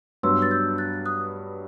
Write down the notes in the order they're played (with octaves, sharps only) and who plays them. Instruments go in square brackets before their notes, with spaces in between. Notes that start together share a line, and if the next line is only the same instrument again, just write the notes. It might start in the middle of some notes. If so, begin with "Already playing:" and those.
[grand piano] G2 F#3 B3 [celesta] C6 E6
[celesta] A6
E6 G6
F#6 A6
D#6 F#6